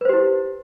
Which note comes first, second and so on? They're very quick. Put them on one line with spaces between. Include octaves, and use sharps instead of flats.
B4 C5 G4 E4